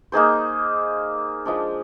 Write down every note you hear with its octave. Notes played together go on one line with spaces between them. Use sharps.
A#3 D#4 G#4 C5
F3 G#3 D4